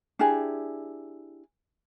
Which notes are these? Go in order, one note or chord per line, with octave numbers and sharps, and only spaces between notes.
D4 E4 G4 G#4